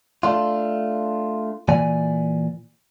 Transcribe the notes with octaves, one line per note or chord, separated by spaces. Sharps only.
A3 D4 F4
A#2 E3 D5 G#5